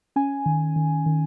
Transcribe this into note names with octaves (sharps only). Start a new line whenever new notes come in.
C#4 G#5
D#3
D#3
D#3